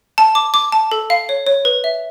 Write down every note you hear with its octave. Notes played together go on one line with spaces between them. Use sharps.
A5
D6
D6
A5
A4
F5
C#5
C#5
B4
E5